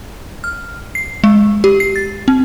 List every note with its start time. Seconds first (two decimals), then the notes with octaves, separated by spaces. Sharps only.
0.44 F6
0.95 C7
1.24 G#3
1.64 G4
1.80 C7
1.96 A6
2.28 C4